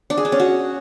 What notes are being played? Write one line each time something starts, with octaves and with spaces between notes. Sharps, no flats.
D4
G#4
D4
C#4
F#4